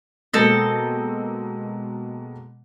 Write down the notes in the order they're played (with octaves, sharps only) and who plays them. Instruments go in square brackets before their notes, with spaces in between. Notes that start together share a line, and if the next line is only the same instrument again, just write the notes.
[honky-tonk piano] B2 G#3 A#3 [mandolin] C4 A4 D#5